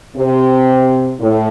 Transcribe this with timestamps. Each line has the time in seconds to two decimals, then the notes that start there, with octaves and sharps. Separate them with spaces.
0.16 C3
1.19 A2